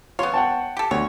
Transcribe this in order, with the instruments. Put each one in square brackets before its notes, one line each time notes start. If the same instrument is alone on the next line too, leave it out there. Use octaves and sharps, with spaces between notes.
[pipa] B3 C#5 [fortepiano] F4 C6
[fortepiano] F#5 G5 A5
[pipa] G4 A4
[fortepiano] D2 [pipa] C#5